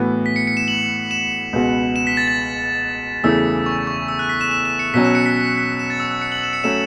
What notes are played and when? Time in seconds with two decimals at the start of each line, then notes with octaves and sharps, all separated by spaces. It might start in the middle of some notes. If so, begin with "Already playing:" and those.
Already playing: A2 E3 B3 F#4
0.26 B6
0.36 C#7
0.47 C#7
0.57 E7
0.68 F#7
1.11 E7
1.53 C#2 B2 B3 F#4
1.96 E7
2.07 B6
2.17 A6
2.28 A6
3.23 E2 C#3 E3 A3 E4 E6
3.66 C#6
3.87 C#6
4.08 E6
4.19 F#6
4.29 B6
4.41 E7
4.51 E7
4.65 E7
4.79 C#7
4.94 B2 F#3 C#4 B6
5.04 E7
5.15 C#7
5.26 B6
5.36 B6
5.58 B6
5.79 E7
5.90 A6
6.00 E6
6.11 E6
6.22 C#7
6.32 F#7
6.43 E7
6.53 C#7
6.64 F#3 A3 C#4 E7